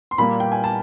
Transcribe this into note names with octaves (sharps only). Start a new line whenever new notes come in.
C6
A#2 G3 A#3 B5
G5
G#5
A5